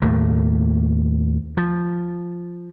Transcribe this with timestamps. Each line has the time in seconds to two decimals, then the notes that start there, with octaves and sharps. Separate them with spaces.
0.02 D#2 A2 A3 A#3
1.57 F3